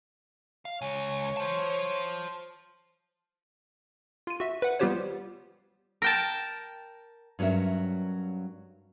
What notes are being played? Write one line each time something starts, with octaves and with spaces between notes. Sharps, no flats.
F5
C#2 C#5 G#5
C5 A5
F4 D#7
F#4 E5
B4 F#5
G3 B3 F4 G4 C5 C#5
A#4 G5 A5
G2 F#3 C#4 A#4 E5